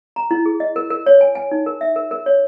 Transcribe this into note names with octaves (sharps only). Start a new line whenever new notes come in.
A#5
E4
G#4
D#5
A#4
A#4
C#5
G#5
G#5
D#4
A#4
E5
A#4
A#4
C#5